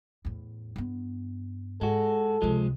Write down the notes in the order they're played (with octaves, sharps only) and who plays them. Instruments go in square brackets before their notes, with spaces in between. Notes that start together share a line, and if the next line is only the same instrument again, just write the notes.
[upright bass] E2 A2
G2 B3
[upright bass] G#2 [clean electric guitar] G#3 F#4 [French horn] A4
[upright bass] C#2 C3 [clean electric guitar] F3 G#3